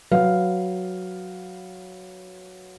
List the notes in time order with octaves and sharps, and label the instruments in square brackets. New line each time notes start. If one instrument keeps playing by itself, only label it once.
[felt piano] F#3 B4 F5